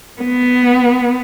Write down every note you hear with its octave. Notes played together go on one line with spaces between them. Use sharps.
B3